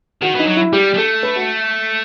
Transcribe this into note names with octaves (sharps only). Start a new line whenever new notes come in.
D#3 F#4
E3 D#4
F#3
E4
G3 G4
G3
A3 A4
B4
F#4